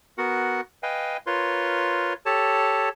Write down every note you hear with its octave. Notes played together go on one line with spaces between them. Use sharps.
B3 F#4 A#4 F#5
B4 D#5 F5 G5 G#5
F4 A#4 B4 C#5 C6
G4 A4 C#5 A5